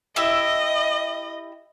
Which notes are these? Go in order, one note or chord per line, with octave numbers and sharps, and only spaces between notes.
E4 G4 D#5 E5